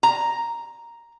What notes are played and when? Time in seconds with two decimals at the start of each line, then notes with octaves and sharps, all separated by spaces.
0.03 A#5